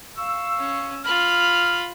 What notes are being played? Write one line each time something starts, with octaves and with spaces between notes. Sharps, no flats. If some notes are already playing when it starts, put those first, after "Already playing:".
F5 C#6 E6
C#4
F4 B5 F6